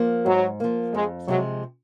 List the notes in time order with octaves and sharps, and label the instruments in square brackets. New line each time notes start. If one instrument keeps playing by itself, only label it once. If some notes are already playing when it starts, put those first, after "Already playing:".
Already playing: [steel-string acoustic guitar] F3 A#3
[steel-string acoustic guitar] G#2 [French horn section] F#3
[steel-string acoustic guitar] F3 A#3
[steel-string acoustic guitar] F2 [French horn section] G#3
[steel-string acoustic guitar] C3 F3 G#3 C4 [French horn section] F#3